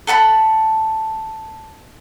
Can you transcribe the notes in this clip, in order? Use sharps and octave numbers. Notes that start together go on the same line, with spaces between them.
A4 F#5 A5 B5